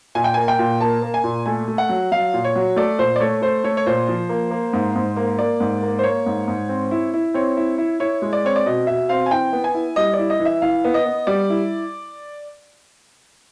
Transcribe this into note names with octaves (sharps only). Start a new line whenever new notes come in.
A#2 G#5
G5
A#3 G#5
G5
A#2
A#3 A5
A#3
G#5
A#2
A3 G#5
A3
F#5
F#3
F#3 F5
A#2
C#5
F#3
A3 D5
A#2 C5
D5
A3 C#5
A3 C5
A3 C#5
C#5
A#2 C5
F3
A#3
A#3
G#2
G#2
A#3
A#3 D5
G#2
A#3
C5
A#3 C#5
G#2
G#2
C4
E4
E4
C4 C#5
E4
E4
E4 C#5
G#3
D5
C4 C#5
D5
B2 D#5
B2 E5
C4 F5
G#5
E3 G5
B3
G#5
E4
G3 D#5
D5
E4
D#5
E3
E5
E3 F5
B3
D#5
B3
G3 D5
E4